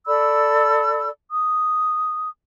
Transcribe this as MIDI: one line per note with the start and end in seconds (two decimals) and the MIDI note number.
0.07 1.10 69
0.07 1.10 74
0.07 1.10 83
0.07 1.10 88
1.32 2.27 87